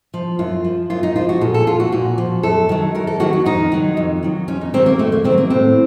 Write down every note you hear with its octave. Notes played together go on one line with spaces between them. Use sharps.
F3
F#2 F4
F3
F#2 F4
D#4
F3 F4
F#4
A#2 A4
A4
F3 F4
F#4
A#2 F#4
F3
F#2 A4
D#3 F#3
F#2 A#4
A4
D#3 F#3 F#4
F#4
F2 D#4
D#3 F#3
F2
D#3 F#3
F2 C#4
D#4
D#3 F#3 C4
A#3
F2 A3
A#3
D#3 F#3 C4
A#3
A2 C4